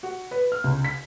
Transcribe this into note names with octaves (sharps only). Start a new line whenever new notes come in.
F#4
B4
F6
C#2
B6